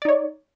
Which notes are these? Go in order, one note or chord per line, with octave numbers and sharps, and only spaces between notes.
D#4 C#5 D5